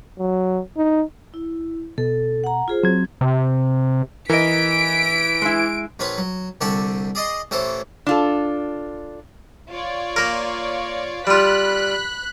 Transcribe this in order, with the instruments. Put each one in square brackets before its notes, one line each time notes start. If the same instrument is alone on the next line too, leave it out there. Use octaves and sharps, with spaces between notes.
[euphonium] F#3
D#4
[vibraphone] E4
[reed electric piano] B2 [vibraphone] A4
[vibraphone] F#5 A#5
F4 G#4 C5
[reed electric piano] F#3 G#6 [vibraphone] C4
[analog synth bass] C3
[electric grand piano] E3 [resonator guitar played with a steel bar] A#4 D#5 [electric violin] B6 [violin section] D7
[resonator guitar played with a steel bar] G#3 E4
[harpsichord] A#1 F4 B4 C#5
F#3
C2 D3 G4 D5 A5 C#6
G#4 D5 D#5 C6
A1 E3 A4 C5 C#5
[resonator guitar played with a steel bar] D4 F4 A4
[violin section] F4 C#5 D5
[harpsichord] A#3 A#4
[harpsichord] G3 F4 [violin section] B5 F#6 B6